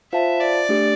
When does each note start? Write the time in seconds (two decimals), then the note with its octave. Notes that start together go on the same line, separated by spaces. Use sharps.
0.12 F4 C5 E5 F5 A5
0.40 D5
0.69 A3 D4 G4